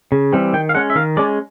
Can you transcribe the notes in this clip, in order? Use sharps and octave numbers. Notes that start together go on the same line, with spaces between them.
C#3
E3 G3 C4
D#3 G5
F5
G#3 C#4 F#5
E5
D#3 F5
G#3 C#4 D5